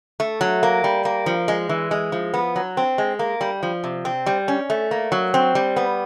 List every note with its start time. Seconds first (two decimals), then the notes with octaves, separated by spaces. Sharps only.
0.20 A3
0.41 F#3
0.63 A#3
0.84 G3
1.05 A#3
1.26 F3
1.48 G#3
1.69 E3
1.91 G#3
2.12 F3
2.34 B3
2.56 F#3
2.77 C4
2.98 G#3
3.19 A#3
3.41 G3
3.63 F3
3.84 C3
4.05 C4
4.26 G3
4.48 C#4
4.70 A3
4.91 A#3
5.12 F#3
5.34 C4
5.55 G3
5.76 B3